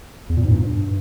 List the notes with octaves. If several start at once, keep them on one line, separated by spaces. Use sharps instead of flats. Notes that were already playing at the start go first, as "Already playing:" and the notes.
E2
A#2
G#2
G2